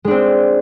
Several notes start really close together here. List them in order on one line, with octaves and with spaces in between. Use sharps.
G#3 D4 C4